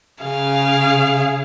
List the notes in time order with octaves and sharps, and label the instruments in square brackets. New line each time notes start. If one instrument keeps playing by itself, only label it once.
[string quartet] C#3 G#4 [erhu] F5